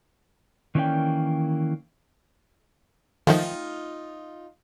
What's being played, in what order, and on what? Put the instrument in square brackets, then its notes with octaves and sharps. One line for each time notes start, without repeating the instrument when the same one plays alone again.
[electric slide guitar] D#3 E3 A#3 C#4 D5 G5
[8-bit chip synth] D#3 F3 [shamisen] A3 F#5 G5 [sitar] D#4 F4